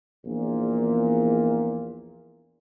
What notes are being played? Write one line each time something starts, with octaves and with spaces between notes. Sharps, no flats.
A#1 E2 A#2